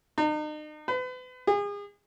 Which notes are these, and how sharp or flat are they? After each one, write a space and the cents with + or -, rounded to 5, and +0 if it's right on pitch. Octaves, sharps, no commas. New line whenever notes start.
D#4 -40
B4 +40
G#4 -35